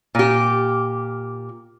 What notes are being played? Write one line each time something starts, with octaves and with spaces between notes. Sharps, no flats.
A#2 G4